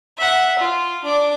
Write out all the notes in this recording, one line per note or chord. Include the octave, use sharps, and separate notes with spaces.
E5 F#5
F4
D4 D6